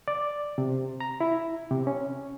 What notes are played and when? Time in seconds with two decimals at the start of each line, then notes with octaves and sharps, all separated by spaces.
0.08 D5
0.58 C3
1.01 A#5
1.21 E4
1.71 C3
1.87 C#4